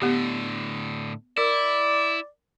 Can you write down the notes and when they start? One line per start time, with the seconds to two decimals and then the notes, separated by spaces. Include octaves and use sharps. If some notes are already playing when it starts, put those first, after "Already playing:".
0.02 A2 D3 B3 G4
1.37 E4 A#4 D5